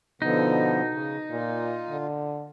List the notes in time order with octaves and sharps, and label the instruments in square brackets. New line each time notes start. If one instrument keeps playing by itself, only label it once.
[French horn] B2 [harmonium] D3 F3 B3 [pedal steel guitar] D#4
[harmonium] C#3
[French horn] A#2 [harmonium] F4
[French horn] D3